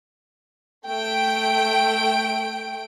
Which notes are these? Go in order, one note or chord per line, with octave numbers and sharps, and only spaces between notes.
A3 G5 D7